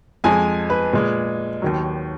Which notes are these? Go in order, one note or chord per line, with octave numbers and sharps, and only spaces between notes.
F2 F3 G#3 G#5
B4
A#2 G#3
D#2 D#3 F#3